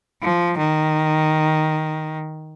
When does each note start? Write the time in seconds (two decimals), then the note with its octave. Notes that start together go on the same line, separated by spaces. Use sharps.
0.22 F3
0.57 D#3